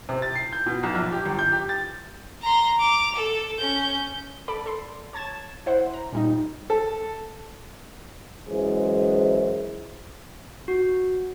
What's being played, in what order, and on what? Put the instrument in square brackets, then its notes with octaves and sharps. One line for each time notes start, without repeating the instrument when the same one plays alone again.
[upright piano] C3
A6
C7
G6
B2
B1
A#1
G4
G1
G6
G4
A6
[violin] A#5 C6
D6 F7
A4
C#4 G6
[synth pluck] A4 D5 B5
A4 C6
C#5 A5 G#6 A6 E7
E4 C5 F#5 C6
A#5
A#2 G3 D#4
[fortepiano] A4
[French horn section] F#2 E3 G#3 G#4 C5
[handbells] F#4